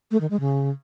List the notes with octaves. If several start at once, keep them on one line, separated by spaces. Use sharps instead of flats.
A3
D#3
G#3
C#3